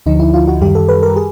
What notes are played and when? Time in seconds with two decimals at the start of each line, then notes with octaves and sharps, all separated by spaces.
0.06 D2 D3 F3 D#4
0.20 E4
0.34 F4
0.48 F#4
0.61 F#2 D#3 G3 G4
0.75 A4
0.89 B4
1.03 A#4
1.16 G#4